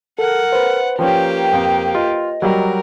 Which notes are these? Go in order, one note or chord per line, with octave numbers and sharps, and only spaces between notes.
A4 A#4 F#5
B4 C5
F3 A#3 C#4 G4 G5
F2
F4 D#5
F#3 G3 F#4 A#4